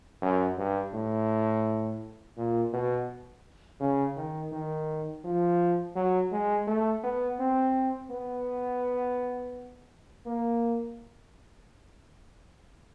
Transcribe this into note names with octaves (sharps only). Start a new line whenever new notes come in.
F#2
G2
A2
A#2
B2
C#3
D#3
D#3
F3
F#3
G#3
A3
B3
C4
B3
A#3